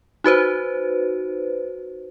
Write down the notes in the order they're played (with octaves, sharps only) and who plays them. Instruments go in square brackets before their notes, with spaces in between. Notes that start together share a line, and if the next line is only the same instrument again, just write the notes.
[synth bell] D#4 F#4 B4 C5